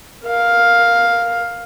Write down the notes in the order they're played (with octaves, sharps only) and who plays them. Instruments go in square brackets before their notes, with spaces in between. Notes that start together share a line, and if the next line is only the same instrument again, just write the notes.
[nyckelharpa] A#4 F5